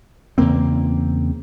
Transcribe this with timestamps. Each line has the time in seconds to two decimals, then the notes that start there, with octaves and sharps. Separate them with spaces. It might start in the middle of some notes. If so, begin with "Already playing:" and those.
0.38 E2 C#3 A#3 C4